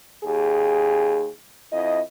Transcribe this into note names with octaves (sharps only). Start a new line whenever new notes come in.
D#2 G4 G#4
F2 E4 D#5